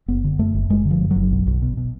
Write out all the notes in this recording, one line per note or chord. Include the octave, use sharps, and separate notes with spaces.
F#1 B3
D3
F#2 A3
F#1
F#1 G#3
D3
F3
F#2
F#3
F#1
B1
B1
B2
B2